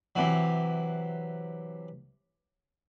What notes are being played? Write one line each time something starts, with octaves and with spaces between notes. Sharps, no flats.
C3 E3 F#3